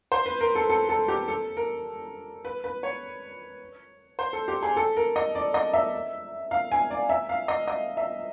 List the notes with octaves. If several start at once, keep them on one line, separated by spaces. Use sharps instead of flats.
C5
B4
A#4
A4
A4
A4
G4
A4
A#4
B4
B4
C#5
C5
A4
G4
G#4
A4
A#4
D#5
D5
D#5
E5
F5
G#5
D5
E5
F5
D#5
D#5
E5